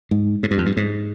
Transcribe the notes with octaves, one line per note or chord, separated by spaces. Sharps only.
G#2
G#2
G2
F2
G2
G#2